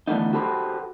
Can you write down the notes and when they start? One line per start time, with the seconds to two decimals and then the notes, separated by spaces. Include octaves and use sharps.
0.08 D3 E3 A3 B3 D#4
0.33 F#4 G4 A4 B4 C5